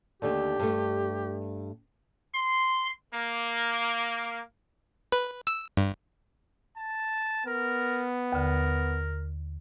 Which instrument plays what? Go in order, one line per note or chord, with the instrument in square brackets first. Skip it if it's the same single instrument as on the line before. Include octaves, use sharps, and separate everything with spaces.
[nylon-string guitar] D#2 D3 A3 [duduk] G4
[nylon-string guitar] G2 A3
[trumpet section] C6
A#3
[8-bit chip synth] B4
E6
G2
[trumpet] A5
[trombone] B3 [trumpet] A#4
[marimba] D#2 D3 [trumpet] A#4